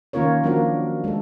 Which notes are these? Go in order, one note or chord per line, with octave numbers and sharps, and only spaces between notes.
D#3 A#3 C#4 F4 A#4 C#5
F3 F#3 A#3 D4 F#4 A#4
G#3 A4